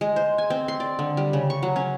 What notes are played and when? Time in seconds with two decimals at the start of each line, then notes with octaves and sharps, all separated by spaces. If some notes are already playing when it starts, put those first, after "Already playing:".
0.01 G#3
0.16 C5
0.38 G#5
0.50 C4
0.68 C6
0.80 D5
0.99 D3
1.17 G3
1.33 C#3
1.50 C#6
1.63 F#3
1.76 C#4